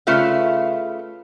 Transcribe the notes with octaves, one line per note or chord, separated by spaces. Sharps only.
C#3 A3 F4 B4 E5 F5